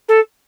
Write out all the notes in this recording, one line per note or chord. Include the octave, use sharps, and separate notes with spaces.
A4